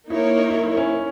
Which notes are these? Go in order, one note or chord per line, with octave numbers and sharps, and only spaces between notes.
A#3 D#4 E4 A#4 C#5
E4
E4
C#4